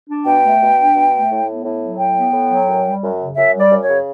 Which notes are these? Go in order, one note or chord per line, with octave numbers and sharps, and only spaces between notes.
D4
B2 G5
A3
B2
D4
B2
A3
A2
B3
A2
F#3
A2 G5
B3
A2
F#3
F#2
G3
F#2
C#3
F#2 E5
G3
D5
F#2
C#5
C#3